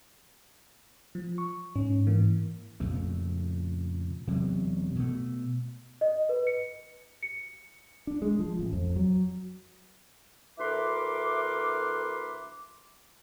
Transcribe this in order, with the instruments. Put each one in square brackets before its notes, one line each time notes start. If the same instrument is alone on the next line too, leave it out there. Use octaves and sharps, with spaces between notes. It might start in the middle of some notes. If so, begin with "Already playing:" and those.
[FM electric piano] F3
C#6
[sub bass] G#2 [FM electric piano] C#4
[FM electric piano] E3 A#3
[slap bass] F2 A#2 C#3 A3
E1 C3 F#3
B2 A3
[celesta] D#5
B4
C#7
C#7
[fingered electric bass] D4
G#3
F3
A1
F2
F#3
[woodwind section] D2 E4 A#4 B4 C6 D6